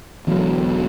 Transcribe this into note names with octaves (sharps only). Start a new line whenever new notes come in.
E1 E2 D3 F#3